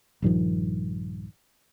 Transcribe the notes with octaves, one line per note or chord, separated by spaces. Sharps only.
A#1 G2 D#3 F3